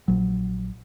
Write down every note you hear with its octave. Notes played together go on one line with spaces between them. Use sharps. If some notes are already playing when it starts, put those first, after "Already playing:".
A#1 F#3